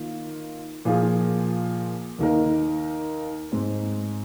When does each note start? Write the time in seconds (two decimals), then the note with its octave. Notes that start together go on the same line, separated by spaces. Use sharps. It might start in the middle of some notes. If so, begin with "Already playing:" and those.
Already playing: D#3 A#3 F4
0.85 A#2 F3 A#3 F4 G#4
2.19 D#2 D#3 A#3 D#4 A#4
3.52 G#2 G#3 C4